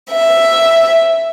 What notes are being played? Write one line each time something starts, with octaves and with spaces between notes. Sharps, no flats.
E5